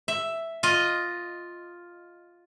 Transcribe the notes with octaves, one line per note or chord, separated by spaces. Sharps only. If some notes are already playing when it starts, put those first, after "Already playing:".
E5
F4 D#5